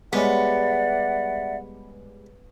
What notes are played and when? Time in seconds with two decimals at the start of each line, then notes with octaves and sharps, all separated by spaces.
0.13 G3 G#3 B3 C#4 D5 E5 F#5